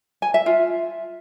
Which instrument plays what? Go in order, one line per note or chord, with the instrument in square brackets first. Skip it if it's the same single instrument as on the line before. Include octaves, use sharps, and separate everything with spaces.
[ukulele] G#5
E5
F4